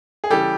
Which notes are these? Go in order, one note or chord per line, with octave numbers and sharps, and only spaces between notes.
G#4
C#3 E3 G3 G4 A4